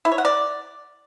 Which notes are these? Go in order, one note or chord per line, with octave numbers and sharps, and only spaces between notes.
E4
C#5
F#5
D5